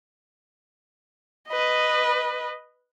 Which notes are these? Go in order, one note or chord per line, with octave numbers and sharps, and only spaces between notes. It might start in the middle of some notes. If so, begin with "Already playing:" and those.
B4 D#5